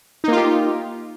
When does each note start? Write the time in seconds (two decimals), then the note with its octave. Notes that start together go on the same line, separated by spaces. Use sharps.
0.24 D#4
0.28 A#3
0.32 F4
0.37 G4